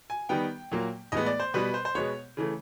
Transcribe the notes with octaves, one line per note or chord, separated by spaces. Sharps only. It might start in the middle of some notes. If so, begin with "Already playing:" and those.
G#5
D#3 G3 B3 G5
A#2 F#3 A#3
A2 E3 G#3 B3 D#5
D5
C5
B2 G3 B3 B4
C5
C5
B2 G#3 B3 C#5
C#3 E3 A3